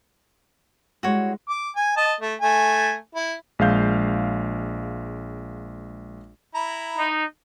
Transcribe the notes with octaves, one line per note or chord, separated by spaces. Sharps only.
G3 G#3 E4 F#4 C#5
D6
G#5
D#5 A5
A3
A3 G#5
E4
A#1 G#3 F5 G6
E4 A#5 B5
D#4